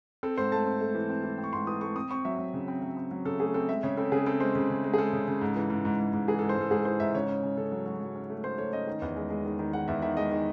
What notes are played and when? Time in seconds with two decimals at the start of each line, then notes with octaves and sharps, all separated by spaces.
0.23 C4 A4
0.38 G#2 C5
0.52 A3 A5
0.67 C4
0.81 A3
0.95 E3
1.09 C4
1.24 E3
1.38 C4
1.44 C#6
1.53 G#2 C6
1.67 E3 D#6
1.81 A3 C#6
1.96 C4 D#6
2.11 C4 C#6
2.25 F#3 E5
2.39 F#3
2.54 C#3
2.68 C4
2.82 F#3
2.97 C4
3.11 F#3
3.25 C#3 A4
3.40 A3 G#4
3.54 C4 A4
3.69 G#3 E5
3.83 C#3 C#5
3.97 C4 A4
4.12 C#3 G#4
4.26 C4 A4
4.40 G#3 C5
4.55 C#3
4.70 C#3
4.84 G#3
4.94 G#4
4.98 G#3 A4
5.13 C#3
5.28 C#3
5.41 G#2
5.56 E3
5.70 G#2
5.85 G#2
5.99 G#2
6.13 G#2
6.28 E3 G#4
6.39 A4
6.42 G#2
6.49 C5
6.57 G#2 A4
6.71 G#2 G#4
6.85 E3 C5
7.00 G#2 E5
7.14 C#3 C#5
7.29 C#4
7.43 C#3
7.57 C#3 A4
7.72 F#3
7.86 F#3
8.01 F#3
8.15 C#4
8.30 A3
8.44 C#4 C5
8.58 A3 C#5
8.73 C#4 D#5
8.87 D#3
9.02 E2
9.17 G#3
9.30 G#3
9.45 D#3
9.59 D#3
9.73 D#3 F#5
9.88 E2 E5
10.02 D#3 E5
10.17 G#3 D#5
10.32 D#3